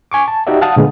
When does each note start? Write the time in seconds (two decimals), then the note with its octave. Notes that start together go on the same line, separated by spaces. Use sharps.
0.12 G#5 C#6 D6
0.28 A5
0.47 D#4 F#4 G4 D5 E5
0.61 F5 F#5 A5 D#6
0.76 A#2 D3 G#3 B3